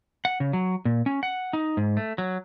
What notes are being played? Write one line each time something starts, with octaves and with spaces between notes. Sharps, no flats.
F#5
C#3
F#3
A#2
C#4
F#5
D#4
G#2
A3
F#3